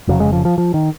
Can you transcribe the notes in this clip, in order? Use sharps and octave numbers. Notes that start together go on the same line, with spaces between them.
F1 F2 C#3 F#3
G#3
F3
F3
F3
D#3